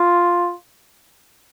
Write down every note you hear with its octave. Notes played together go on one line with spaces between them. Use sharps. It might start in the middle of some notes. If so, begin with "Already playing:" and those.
Already playing: F4